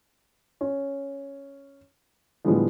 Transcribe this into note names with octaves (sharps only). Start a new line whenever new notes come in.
C#4
A2 D3 F3 G3 G#3 B3